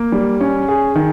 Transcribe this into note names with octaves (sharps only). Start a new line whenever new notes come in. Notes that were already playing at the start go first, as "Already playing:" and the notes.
Already playing: A#3
G3
C#4
G#4
D#3